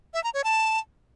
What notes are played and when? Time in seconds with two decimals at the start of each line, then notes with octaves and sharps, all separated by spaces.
0.14 E5
0.24 A#5
0.34 C#5
0.44 A5